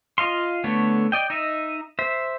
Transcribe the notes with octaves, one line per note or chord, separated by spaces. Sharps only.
F4 D#5 F5 C6
D3 A3 B3 C#5
D5 D#5 G5
D#4 D#5 E5
C5 E5